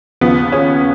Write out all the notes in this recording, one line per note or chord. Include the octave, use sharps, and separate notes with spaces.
D#2 C#3 F3 B3
C#4